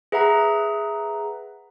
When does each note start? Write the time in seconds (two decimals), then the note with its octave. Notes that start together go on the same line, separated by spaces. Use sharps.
0.12 G#4 B4 E5 F#5 A#5